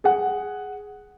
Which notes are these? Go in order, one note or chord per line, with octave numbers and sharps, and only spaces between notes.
G#4 F#5